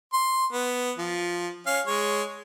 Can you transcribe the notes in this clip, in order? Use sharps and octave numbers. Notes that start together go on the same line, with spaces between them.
C6
B3
F3
C#4 F5
G#3 C#5